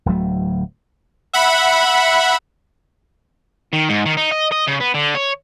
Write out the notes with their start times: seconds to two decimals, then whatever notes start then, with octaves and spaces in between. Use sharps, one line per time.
0.06 D1 D2 F#3 A3
1.33 E5 F#5 B5
3.73 D#3
3.89 G#2
4.06 D#3
4.17 D#4
4.31 D#5
4.52 D#5
4.67 C#3
4.80 B3
4.94 D3
5.15 C#5